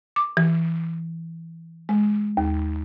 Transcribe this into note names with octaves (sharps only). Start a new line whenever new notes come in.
D6
E3
G#3
D#2